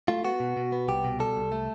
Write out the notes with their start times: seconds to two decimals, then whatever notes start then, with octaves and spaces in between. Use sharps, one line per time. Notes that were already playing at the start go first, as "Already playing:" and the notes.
0.08 A3 F4
0.25 B3 F#4
0.40 B2
0.57 B2
0.72 B3
0.88 C2 G4
1.04 B2
1.20 G3 A4
1.36 C2
1.52 A3